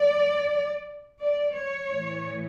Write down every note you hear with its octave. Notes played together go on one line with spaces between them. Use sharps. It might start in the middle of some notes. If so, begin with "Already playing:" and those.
Already playing: D5
D5
C#5
A2 E3